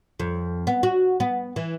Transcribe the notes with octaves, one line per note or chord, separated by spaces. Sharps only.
F2
B3
F#4
B3
E3